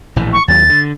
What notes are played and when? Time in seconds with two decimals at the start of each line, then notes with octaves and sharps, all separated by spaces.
0.16 A#1 A2 E3
0.33 C#6
0.48 D#2 F#3 A6
0.69 D3